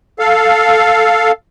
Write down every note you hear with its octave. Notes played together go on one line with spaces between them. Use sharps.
A4 F5